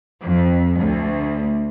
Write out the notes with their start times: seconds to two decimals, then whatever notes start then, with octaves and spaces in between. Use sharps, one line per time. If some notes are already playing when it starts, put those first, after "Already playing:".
0.22 F2
0.79 D2